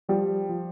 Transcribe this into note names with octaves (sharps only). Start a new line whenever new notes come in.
F3 G3
F3